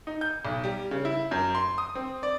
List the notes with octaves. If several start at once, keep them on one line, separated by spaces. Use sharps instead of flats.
D#4
G6
B1
G3
C#3
E4
F#2
C6
D#6
C4
D5